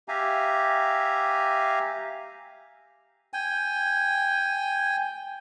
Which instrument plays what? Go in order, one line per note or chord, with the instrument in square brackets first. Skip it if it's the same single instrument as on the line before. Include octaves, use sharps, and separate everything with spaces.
[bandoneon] G4 E5 F5 G#5 A#5
[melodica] G5 G#5